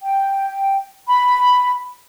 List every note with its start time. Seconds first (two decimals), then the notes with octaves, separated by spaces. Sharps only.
0.02 G5
1.09 B5